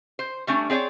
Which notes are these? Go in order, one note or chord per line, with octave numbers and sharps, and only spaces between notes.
C5
G3 A3 C#4 D4
C4 G#4 C#5 D5